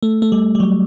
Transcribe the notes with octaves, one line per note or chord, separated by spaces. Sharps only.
A3
A3
G3
G3
F#3